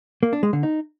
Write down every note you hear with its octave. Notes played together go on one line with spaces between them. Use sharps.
A#3
D4
G#3
D3
D#4